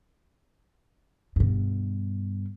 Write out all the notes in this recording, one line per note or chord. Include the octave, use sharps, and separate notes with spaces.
G2 B2